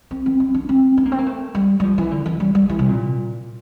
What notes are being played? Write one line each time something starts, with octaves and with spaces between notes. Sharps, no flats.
C4
C4
C4
D4
C4
D4
A#3
C4
A#3
A3
G3
G3
F3
E3
D3
E3
G3
G3
E3
C3
A#2